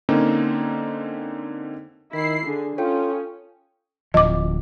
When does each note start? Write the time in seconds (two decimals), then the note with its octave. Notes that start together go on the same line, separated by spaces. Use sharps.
0.09 D3 A#3 C4 C#4 D#4
2.13 D#3 E4 B6 C7
2.47 D3 D4 G#4
2.78 C#4 F4 A4 C#5 G5
4.14 D1 F3 D#5 D6